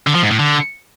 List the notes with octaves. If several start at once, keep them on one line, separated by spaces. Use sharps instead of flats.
D3
F3
G#2
A2
D3